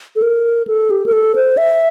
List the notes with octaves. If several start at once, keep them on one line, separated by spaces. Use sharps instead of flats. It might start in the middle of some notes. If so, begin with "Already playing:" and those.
A4
A#4
A4
G4
A#4
A4
C5
E5